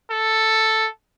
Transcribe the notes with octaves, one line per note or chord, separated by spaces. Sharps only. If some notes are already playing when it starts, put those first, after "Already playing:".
A4